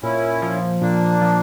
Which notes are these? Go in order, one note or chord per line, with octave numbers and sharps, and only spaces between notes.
A#2 C#4 E4
F3
A#2 A#3 D4
F3